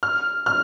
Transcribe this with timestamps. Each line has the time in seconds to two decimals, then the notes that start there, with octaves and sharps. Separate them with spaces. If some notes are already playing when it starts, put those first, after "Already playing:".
0.03 F6
0.46 F6